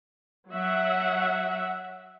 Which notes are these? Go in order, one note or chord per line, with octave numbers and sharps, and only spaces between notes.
F#3 E5 F#5